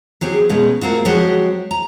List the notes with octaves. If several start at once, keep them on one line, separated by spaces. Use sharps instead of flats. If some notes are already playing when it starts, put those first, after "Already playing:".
F#3 C4 G4 G#4
B2 G#3 C#4 D#4
A3 A#3 C4 F4 F#4
F3 F#3 G#3 C4 F#4 G4
A#5